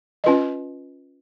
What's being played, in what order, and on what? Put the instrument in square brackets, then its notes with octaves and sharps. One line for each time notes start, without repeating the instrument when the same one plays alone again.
[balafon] C#4 F4 B4 D#5